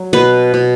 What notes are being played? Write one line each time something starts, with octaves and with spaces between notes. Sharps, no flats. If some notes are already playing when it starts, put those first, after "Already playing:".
Already playing: F#3
B2 B4
B2